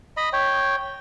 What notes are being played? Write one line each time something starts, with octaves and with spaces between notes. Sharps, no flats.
D#5 B5
C#5 G5